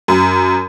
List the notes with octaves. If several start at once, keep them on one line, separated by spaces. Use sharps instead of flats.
F#2